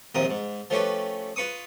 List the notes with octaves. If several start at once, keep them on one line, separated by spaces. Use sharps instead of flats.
A#1 D#2 C3 F3 A#5 D#6
G#2
F3 A3 C#4 G4 B4
F4 B4 C#6 D#6